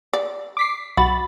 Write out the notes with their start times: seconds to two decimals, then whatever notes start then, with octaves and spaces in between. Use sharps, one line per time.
0.13 D5
0.57 D6 B6 C7
0.97 B1 F#4 B5 A6